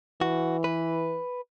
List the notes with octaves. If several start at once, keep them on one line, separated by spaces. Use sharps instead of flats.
E3 F#4
B4